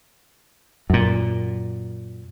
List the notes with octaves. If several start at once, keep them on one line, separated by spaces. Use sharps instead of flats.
F#2 A#2